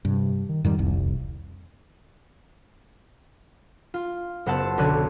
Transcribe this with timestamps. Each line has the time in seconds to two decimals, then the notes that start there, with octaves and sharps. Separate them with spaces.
0.05 G2 C3
0.49 D#3
0.64 F2 G#2 D#3 G3
0.78 D#1 C2
3.94 F4
4.46 F#1 B3 C5 F#5 A5 E6
4.78 B1 D3 C#4 F#6